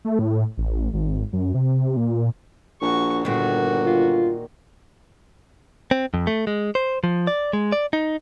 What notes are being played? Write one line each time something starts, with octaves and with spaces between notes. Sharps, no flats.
A3
A2
A1
G#1
F#2
C3
A#2
A#1 F#4 C#6
G1 A#2 D#3 F#4
F4
C4
F2
A3
G#3
C5
F3
D5
G#3
D5
D#4